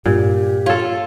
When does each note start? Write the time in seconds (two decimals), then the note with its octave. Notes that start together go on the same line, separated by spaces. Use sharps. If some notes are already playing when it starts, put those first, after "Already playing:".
0.06 G2 A#2 G4
0.66 F4 A4 C#5